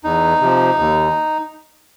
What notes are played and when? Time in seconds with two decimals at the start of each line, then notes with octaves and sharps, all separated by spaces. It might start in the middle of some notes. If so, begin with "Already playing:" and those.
0.04 E2 D#4
0.41 C3 F3
0.79 D#2